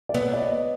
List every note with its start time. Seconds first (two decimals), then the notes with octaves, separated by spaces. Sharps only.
0.09 D5
0.14 B3 C#5
0.33 D5
0.42 D#5